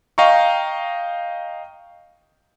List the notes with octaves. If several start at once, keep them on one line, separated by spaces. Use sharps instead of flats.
D#5 F5 G5 A#5 C#6